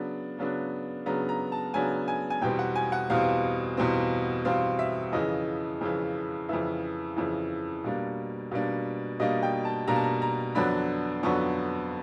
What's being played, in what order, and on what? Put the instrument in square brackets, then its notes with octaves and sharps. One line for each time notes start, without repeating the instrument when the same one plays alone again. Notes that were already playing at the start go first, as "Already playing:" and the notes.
Already playing: [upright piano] C#3 F#3 B3 D4
C#3 F#3 B3 D4
C#3 F#3 B3 D4 A#5
A#5
A5
C#3 F#3 B3 D4 G#5
G#5
G#5
E2 B2 G3 C4 G5
F#5
G#5
F#5
E2 B2 G3 C4 F5
E2 B2 G3 C4
E2 B2 G3 C4 F5
E5
F2 C#3 E3 D#5
F2 C#3 E3
F2 C#3 E3 E5
F2 C#3 E3
B2 G3 A#3 D4
B2 G3 A#3 D4
B2 G3 A#3 D4 D#5
G5
A5
B2 G3 A#3 D4 A#5
A5
A#5
A#5
F2 D3 F#3 B3 D4 B5
F2 D3 F#3 B3 D4 C#6